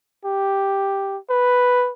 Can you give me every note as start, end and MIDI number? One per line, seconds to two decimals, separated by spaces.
0.25 1.18 67
1.30 1.92 71